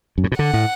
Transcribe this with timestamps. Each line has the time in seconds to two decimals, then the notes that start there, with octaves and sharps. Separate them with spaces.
0.18 F#2
0.24 A2
0.32 B2
0.39 D3 F#5
0.54 A2